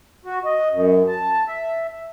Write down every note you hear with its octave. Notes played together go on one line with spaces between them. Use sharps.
F#4
D#5
F#2
A5
E5